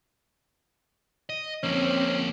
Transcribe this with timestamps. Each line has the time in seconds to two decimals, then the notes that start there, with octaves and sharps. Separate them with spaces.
1.29 D#5
1.63 F2 A#3 C4 C#4